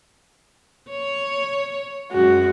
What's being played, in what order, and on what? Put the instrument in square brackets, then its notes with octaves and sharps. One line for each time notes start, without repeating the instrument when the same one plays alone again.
[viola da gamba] C#5
[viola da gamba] F#2 G#3 [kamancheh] F#4